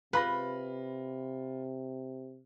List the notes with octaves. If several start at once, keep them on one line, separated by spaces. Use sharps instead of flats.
C3 F4 B4 B5 A#6